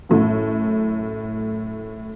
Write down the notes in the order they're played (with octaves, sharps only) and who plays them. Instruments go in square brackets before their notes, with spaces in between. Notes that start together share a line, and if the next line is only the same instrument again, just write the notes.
[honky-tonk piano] F#2 A2